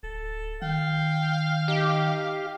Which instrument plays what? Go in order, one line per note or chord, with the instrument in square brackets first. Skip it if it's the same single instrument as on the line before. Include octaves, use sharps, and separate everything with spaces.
[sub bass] D1 [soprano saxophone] A4
[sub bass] D#3 [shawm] F5 [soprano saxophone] G5
[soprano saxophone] D#4 [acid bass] G4